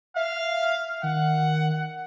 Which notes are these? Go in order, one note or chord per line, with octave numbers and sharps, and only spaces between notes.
E5 F5
D#3 F#5